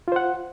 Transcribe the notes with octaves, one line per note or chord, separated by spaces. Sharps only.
F4 C5 F#5